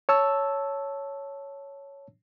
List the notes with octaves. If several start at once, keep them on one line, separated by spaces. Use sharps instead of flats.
C#5 A5 E6